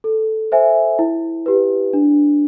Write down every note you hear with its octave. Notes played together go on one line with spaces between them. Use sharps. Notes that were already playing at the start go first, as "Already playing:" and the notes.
A4
C5 E5 G#5
E4
G4 B4
D4